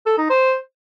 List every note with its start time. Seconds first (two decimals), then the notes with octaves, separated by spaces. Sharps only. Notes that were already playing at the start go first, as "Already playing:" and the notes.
0.06 A4
0.18 D#4
0.30 C5